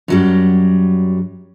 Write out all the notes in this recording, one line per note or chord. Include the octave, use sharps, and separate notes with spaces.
F#2 F#3 G3